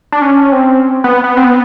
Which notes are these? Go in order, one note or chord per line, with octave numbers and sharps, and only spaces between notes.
D4
C#4
C4
B3
B3
C4
B3